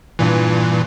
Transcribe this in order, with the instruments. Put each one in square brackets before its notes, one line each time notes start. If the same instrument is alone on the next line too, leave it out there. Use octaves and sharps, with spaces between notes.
[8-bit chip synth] G2 A#2 E3